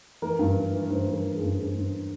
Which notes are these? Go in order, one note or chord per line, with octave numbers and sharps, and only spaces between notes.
E3 A#4
G2
E3
E3
G2 C5
E3
A#4
E3
G#4
G2
G2 G#4
G2